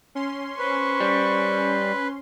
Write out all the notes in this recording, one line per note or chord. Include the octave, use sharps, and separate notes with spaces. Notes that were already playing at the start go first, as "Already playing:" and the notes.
C#4 C6
B4 C5 C#6
G3